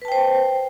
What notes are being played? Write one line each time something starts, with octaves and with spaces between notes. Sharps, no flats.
B4 C5 G5 A5